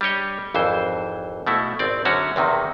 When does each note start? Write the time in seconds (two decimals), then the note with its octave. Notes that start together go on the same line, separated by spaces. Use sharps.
0.01 G3 D4 G4 C#5 D#5
0.54 G#1 F2 E3 C5
1.47 B2 A3 E4 F#4
1.79 G#1 C4 D5
2.05 F#2 D3 C#4 F#4 C#5
2.36 E2 C3 D#3 D#4